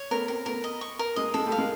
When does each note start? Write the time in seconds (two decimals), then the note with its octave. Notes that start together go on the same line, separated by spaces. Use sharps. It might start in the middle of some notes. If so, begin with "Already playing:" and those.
Already playing: C#5
0.11 A3 B3 A#4
0.28 A#3 C4 A#4
0.46 A3 B3 A#4
0.64 D#5
0.81 C#6
0.99 A#4
1.16 G#3 A#3 D#5
1.34 G#3 A#3 A4
1.46 G3 A3
1.52 F5
1.57 G#3 A#3